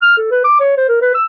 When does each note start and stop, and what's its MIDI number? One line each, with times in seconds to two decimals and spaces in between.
0.02 0.14 89
0.18 0.27 69
0.31 0.41 71
0.44 0.57 86
0.60 0.76 73
0.77 0.87 72
0.89 0.97 70
1.01 1.10 71
1.15 1.24 88